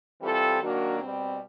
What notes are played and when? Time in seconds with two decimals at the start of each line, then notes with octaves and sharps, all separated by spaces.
0.21 E3 G3 C4 F4 A4
0.61 D#3 F#3 A#3 D4 F#4
1.00 B2 G3 C4